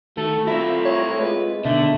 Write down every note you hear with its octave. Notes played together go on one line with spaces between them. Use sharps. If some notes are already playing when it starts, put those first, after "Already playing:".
D#3 A3 F#4 A4
A3 C4 E4 F4 E5 A#5
C#5
G#3 F4 B4
B2 D3 D#3 A3